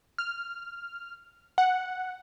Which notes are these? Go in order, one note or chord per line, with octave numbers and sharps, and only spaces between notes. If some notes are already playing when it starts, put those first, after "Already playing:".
F6
F#5